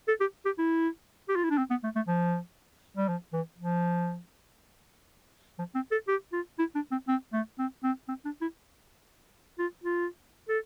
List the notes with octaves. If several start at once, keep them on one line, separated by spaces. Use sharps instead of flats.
A4
G4
G4
E4
G4
F4
E4
D4
C4
B3
A3
A3
F3
G3
F3
E3
F3
F3
C4
A4
G4
F4
E4
D4
C4
C4
A3
C4
C4
C4
D4
E4
F4
F4
A4